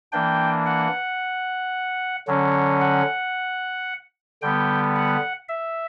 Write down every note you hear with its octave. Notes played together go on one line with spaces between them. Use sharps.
E3 A#3 D4 G5
F#5
D3 F#3 C#4
F#5
D3 G3 B3 G5
F#5
E5